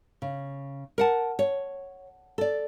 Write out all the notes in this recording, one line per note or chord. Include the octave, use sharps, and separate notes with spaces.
C#3
A#4 F#5 A5
C#5
A4 D5